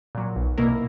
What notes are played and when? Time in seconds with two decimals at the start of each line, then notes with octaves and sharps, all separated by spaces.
0.15 A#2 F#3
0.36 B1
0.58 B2 A#3 E4 A#4